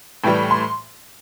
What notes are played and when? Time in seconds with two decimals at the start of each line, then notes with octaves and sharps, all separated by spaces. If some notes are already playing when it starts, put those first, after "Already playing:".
0.24 A2 E3 G3 G5
0.51 C6